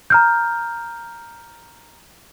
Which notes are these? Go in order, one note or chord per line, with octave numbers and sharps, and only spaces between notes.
A#5 F6 G6